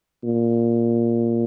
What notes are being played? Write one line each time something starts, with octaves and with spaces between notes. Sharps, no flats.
A#2